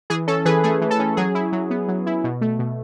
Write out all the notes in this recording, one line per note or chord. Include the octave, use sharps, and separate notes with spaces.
E3 G#4
C#4 A4
E3 G#4 B4
A3 G#4
E3
A4
C#4
F#3 G#4
E4
F#3
B3
F#3
E4
B2
A3
B2